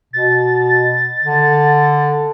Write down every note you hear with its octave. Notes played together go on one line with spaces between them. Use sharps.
B2 A6
D3